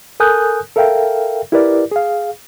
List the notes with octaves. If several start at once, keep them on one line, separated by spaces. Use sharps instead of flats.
A4 A#4 G#5 D#6 F#6 G6
A4 A#4 E5 F5 G5
E4 G4 A#4 B4 D5
G#4 F5